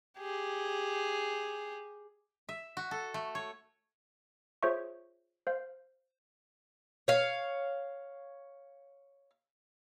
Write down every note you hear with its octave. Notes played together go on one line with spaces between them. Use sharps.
G4 G#4
E5
F#4
A4
A3
C#5
F4 G#4 C5 C#5 E5 C#6
C5 F5
C#5 F5